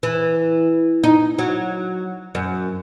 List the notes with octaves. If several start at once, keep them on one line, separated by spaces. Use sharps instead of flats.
E3
D#4
F#3
F#2